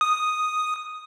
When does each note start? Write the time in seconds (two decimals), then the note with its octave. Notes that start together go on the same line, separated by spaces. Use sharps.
0.01 D#6